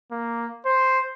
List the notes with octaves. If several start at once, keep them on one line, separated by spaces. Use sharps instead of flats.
A#3
C5